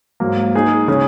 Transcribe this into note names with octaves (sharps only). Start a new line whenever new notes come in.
G#2 F#3 A#3
G#3 D#4 G#4
C#3 G#3 C#4 G#4